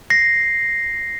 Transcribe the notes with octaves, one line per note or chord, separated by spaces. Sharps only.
A#6 C7